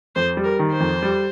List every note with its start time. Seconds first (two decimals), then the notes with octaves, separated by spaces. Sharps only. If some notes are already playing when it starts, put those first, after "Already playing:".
0.15 F2 C5
0.37 G3
0.44 A#4
0.59 D#3
0.73 C5
0.80 F2
1.02 G3